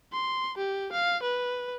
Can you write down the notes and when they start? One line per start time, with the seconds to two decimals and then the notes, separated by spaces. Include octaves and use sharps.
0.13 C6
0.58 G4
0.92 F5
1.23 B4